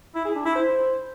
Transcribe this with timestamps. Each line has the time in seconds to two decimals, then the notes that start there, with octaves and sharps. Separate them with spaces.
0.15 E4
0.25 G#4
0.35 D4
0.45 E4
0.55 C5